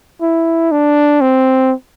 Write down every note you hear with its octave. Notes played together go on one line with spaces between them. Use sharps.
E4
D4
C4